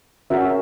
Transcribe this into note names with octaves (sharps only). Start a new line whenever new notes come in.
C#4 F#4 A#4 E5